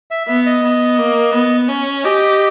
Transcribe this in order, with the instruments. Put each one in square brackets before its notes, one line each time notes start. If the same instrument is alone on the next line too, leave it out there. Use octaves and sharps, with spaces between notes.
[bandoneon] E5
[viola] B3 [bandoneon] E5
[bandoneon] D#5
[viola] B3
A#3
B3
C#4
[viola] G4 [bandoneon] D#5